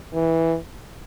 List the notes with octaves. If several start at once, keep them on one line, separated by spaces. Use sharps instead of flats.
E3